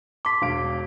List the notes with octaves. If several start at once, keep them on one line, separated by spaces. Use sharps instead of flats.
A5 C6 D6 B6
E1 F5 D7